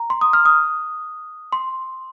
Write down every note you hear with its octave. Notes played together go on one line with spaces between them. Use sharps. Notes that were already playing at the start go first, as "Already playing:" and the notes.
Already playing: A#5
C6
D#6
F6
D#6
C6